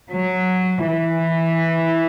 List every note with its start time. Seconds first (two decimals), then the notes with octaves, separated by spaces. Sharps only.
0.14 F#3
0.90 E3